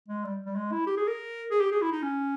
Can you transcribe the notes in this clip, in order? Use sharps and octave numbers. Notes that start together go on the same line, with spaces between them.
G#3
G3
G3
G#3
E4
G4
G#4
A#4
G#4
G4
G#4
E4
D#4
C#4